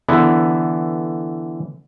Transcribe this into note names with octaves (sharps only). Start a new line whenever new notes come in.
D3 E3 B3